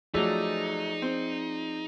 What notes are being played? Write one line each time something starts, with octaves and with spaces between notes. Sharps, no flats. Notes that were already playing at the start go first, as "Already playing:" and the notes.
F3 F#3 A3 D#4 G#4 D5
C4